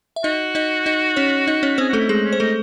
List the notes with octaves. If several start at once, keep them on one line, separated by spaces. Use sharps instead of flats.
E5
D#4 F#4 D#5
D#4 D#5
D#4 D#5
C#4 C#5
D#4 D#5
C#4 C#5
C4 G#4 C5
A3 F#4 A4
E4
G#3 D#4 G#4
C#4
C5
A3 D#4 A4